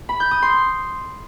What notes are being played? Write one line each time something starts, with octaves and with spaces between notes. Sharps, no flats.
B5
G6
D#6
C6